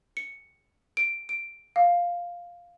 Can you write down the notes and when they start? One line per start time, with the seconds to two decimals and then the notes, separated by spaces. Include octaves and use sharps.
0.17 C#7
0.97 D7
1.29 D7
1.76 F5